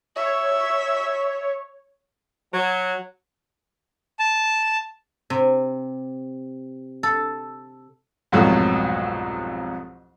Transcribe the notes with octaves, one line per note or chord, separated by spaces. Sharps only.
C#5 E5
F#3
A5
C3
A4
C2 F2 G#2 B2 F#3 A3